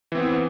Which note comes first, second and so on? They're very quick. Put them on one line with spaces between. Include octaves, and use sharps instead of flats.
E3 C4 B3